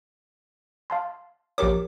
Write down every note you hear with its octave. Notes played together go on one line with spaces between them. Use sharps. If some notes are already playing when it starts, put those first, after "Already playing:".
F5 A5 C6
A#1 G4 A#4 C#5 D6